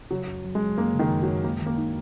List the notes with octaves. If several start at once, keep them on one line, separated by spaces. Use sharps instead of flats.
C#3 F#3
F#2
F#3
G#3
F#3
F#2 A#3
C#3
D#3
F#2
F#3
F#2
G#3 A#3
D#3
A#3
D#4